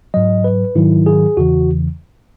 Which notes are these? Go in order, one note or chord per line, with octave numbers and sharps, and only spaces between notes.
G#2 F#3 D#5
B4
G#2 D#3 F#3 E4
G#4
E2 C#3 E3 F#4